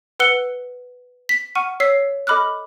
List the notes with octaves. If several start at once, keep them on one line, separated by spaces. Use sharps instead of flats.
B4 F#5 E6 F#6 C#7 G7
B6
F#5 C#6 F6 D#7
C#5 E6 B6 C7
A4 D#5 B5 D6 F6 F#6